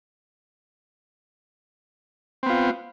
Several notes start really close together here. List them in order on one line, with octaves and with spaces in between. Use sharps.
C4 B3 F4